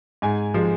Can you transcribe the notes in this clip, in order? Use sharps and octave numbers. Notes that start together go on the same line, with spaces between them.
G#2 G#5
F3 G#3